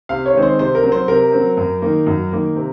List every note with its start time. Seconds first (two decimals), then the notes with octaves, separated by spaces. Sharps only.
0.09 C3 F5
0.26 C#5
0.34 D#3 G#3 C4
0.42 C5
0.59 C3 C5
0.75 A#4
0.83 F#3 C4
0.92 C5
1.08 C3 A#4
1.32 F#3 C4
1.57 F#2
1.82 D#3 A#3
2.07 F#2
2.31 D#3 A#3
2.56 C3